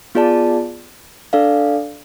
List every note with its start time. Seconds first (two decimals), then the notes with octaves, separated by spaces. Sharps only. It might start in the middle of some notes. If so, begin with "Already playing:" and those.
0.15 B3 F4 G#4 D5 A5
1.33 D4 A4 D5 F5